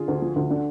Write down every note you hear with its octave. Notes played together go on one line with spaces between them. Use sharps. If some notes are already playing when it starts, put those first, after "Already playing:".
Already playing: D3 F4 G#4
D2
F3
D2
D3